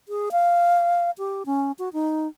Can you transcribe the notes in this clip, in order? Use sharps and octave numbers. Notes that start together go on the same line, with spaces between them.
G#4
F5
G4
C#4
F#4
D#4